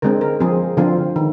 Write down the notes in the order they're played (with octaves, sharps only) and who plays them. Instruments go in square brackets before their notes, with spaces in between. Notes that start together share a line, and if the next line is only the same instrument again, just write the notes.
[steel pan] D3 G#3 C4 A#4
A#4
F3 C4 G#4
D3 F3 C4 F4
D#3